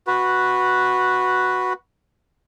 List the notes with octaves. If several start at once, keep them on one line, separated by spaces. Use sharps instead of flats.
F#4 B4